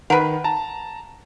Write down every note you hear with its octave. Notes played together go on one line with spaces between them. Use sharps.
D#3 A#4 B4 F#5
A5 A#5